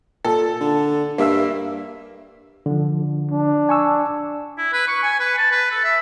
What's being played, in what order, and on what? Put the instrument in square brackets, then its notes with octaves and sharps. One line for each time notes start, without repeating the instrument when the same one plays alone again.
[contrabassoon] A#2 [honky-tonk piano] A4
[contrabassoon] D3
[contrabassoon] G2 [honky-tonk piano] A#3 E5 E6
[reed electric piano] D3 F3
[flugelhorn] D4
[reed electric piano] G#5 C#6 E6
[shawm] E4
B4
C#6
G#5
B4
A5
B4
A4
E5